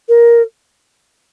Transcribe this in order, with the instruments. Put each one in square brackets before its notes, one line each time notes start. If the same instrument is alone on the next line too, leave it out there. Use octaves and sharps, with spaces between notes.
[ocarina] A#4